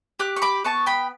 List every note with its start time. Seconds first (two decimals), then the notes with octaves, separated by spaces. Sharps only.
0.19 G4 D6 F#6
0.36 C#6
0.42 B5 D6
0.64 B3 A5 C#6
0.86 G5 B5